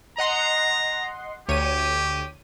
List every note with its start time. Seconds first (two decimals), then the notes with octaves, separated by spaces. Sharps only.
0.18 D#5 F#5 A#5 C6
1.49 D2 G4 C#5 D#7